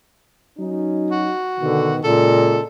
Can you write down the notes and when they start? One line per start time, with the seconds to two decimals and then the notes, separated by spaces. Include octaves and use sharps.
0.58 F#3 C#4 D#4
1.11 F#4
1.59 B2 D3 D#3
2.04 A#2 C#3 G#3 A4